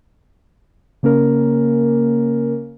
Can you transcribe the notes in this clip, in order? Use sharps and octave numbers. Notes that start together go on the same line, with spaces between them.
C#3 A#3 C#4 A#4